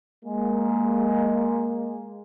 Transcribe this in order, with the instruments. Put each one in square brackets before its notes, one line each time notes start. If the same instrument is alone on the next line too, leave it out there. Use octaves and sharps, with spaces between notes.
[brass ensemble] G#3 A#3